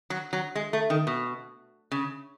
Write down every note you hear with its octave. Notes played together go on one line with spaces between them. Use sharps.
F#3
F#3
G#3
A3
D#3
B2
C#3